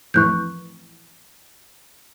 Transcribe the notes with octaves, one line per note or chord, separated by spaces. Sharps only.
F2 A2 E3 C#6 F#6 G6